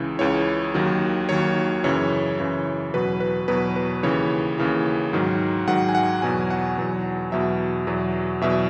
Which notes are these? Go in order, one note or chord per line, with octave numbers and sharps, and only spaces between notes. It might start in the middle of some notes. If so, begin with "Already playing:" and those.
Already playing: C#2 C#3 E3
C#2 C#3 E3 C#5
D#2 D#3 F#3
D#2 D#3 F#3 C#5
F#2 C#3 E3 C#5
F#2 C#3 E3
E2 B2 F#3 B4
B4
E2 B2 F#3 B4
B4
D#2 C#3 E3 C#5
D#2 C#3 E3
G#2 D#3 F#3
G#2 D#3 F#3 F#5
G#5
F#5
E2 B2 F#3 G#5
F#5
E2 B2 F#3
E2 B2 F#3 E5
E2 B2 F#3
E2 B2 F#3 E5